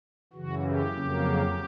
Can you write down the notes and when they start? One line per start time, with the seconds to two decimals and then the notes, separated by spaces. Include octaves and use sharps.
0.33 F#2 C#3 E3 F#4
0.64 G4
0.94 F2 C#3 F#3 A#3